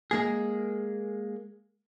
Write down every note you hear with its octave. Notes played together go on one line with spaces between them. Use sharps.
G#3 A#3 G#4